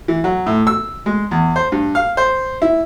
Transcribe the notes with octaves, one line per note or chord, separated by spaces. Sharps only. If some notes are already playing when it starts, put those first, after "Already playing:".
E3
F#3
A2
E6
G#3
E2
C5
G2
F5
C5
E4